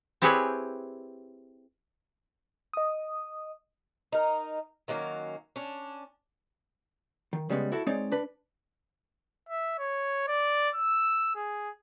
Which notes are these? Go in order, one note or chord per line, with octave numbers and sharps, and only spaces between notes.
C4 E4 G4 G#4 B4 C#5
D#5 D#6
D#4 A#4
D#3 F#3 A#3 C#4
C#4 D4
D#3
C#3 G3 G#3 B3
E4 F#4 A4
G#3 C4 D#4 C#5 D5
D4 B4
E5
C#5
D5
E6
G#4